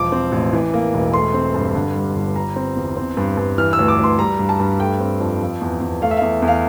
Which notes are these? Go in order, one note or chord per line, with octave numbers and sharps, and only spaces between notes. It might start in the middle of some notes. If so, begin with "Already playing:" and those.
Already playing: E1 F3 D6
C4
A1
E3
A#3
E1
A3 C6
C4
G2
D3
G3
G1
G3 A#5
C4
E2
C4
G2
G2
E3 F6
E6
D2
D6
D2 C6
G3 A#5
G2
A5
G2
A3 G5
C4
F2
F3
E2
E2
A3 F5
E5
E2 F5
E2
F5